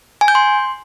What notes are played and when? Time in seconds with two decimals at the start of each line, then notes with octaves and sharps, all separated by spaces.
0.21 G#5
0.28 G6
0.35 C6